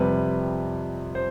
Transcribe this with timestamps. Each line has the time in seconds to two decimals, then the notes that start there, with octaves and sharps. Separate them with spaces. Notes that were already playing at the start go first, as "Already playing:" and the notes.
Already playing: F2 C3 G3 B4
1.15 C5